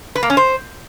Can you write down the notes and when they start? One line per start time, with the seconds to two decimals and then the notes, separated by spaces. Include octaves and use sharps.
0.15 B4
0.23 A#3
0.30 C#4
0.37 C5